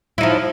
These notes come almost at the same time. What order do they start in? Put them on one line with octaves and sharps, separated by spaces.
E4 D#4 F3